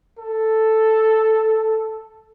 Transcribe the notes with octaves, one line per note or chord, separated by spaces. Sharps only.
A4